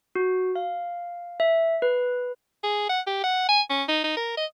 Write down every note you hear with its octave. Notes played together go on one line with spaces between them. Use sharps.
F#4
F5
E5
B4
G#4
F#5
G4
F#5
G#5
C#4
D#4
D#4
A#4
D#5